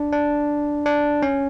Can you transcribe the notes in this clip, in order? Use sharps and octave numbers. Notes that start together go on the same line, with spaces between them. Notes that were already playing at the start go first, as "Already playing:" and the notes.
Already playing: D4
D4
D4
C#4